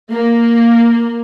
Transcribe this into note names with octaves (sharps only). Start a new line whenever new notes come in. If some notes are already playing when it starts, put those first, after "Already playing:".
A#3